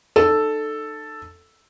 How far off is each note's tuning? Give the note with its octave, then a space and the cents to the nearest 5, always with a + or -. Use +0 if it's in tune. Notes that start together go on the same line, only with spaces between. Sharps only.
D#4 -40 A4 +0